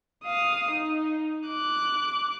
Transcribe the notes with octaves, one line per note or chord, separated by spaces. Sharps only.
F5 D#6
D#4
D6 F#6